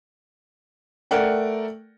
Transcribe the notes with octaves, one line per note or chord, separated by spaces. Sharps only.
A3 A#4 D5 F#5 G5